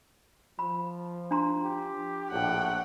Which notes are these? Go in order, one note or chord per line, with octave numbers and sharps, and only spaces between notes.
F3 B5
D4 A#5 C6
G4
A#1 A2 F#5 G5